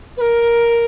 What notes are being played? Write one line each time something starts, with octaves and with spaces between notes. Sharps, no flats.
B4
A#4